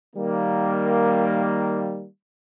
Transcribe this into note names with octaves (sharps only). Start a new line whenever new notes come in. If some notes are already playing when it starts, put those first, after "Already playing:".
D#3 G3 A#3